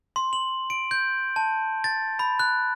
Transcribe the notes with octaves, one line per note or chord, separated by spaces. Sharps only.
C6
F#7
D7
G6
A5
A6
B5
F#6